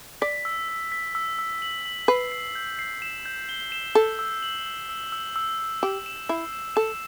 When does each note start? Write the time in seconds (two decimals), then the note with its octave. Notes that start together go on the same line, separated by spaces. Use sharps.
0.22 D5 B6
0.45 E6
0.69 E6
0.92 B6
1.15 E6
1.39 E6
1.62 F#7
1.85 F#7
2.08 B4 C7
2.32 C7
2.55 G6
2.79 C7
3.02 E7
3.26 G6
3.49 G7
3.72 E7
3.95 A4 E6
4.19 E6
4.42 F#7
4.66 E6
4.89 E6
5.12 E6
5.36 E6
5.59 E6
5.83 G4 E7
6.06 E7
6.29 E4 C7
6.53 E7
6.76 A4 E7